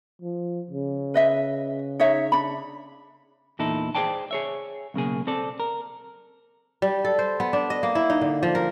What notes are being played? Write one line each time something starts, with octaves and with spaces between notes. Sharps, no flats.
F3
C#3
B4 D#5 E5
D#4 C#5 E5
D4 B5
E2 A#2 D#4 E4 A4
G#4 A4 C5 D5 G5 A5
G#4 C#5 E5
B1 C#3 A#3 G#4
C4 A4 D5
A#4
G3
A4
C5
B3
D4
D#5
A#3
E4
D#4
D3
F3
A#4